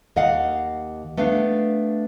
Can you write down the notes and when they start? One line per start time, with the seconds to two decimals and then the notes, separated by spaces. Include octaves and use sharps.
0.16 D#2 D#5 F5 F#5
1.17 A3 B3 D4 F5